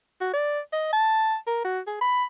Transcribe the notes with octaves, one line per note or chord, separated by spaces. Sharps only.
F#4
D5
D#5
A5
A#4
F#4
G#4
B5